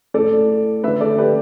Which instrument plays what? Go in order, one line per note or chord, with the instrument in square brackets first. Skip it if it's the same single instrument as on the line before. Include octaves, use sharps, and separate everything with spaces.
[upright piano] A2 A3 A4 D5
D3 A3 B4 E5
A4 D5
G4 B4